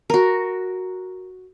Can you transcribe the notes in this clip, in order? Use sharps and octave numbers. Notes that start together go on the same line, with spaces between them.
F#4 A#4